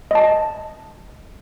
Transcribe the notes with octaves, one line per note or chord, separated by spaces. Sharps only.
D#5 A5